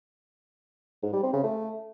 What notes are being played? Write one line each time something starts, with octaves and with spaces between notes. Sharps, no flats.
G#2
G3
C4
C#3
A3